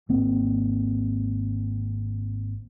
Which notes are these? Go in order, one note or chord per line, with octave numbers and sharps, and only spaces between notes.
G#1 A#3 C4